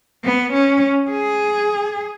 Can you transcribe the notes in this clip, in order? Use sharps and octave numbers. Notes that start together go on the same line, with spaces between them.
B3
C#4
G#4